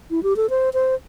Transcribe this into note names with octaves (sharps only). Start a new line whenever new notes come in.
E4
G4
A4
C5
C5